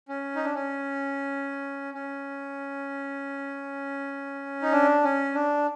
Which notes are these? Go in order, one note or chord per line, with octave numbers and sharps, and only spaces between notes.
C#4
D#4
D4
C#4
C#4
D#4
D4
C#4
D4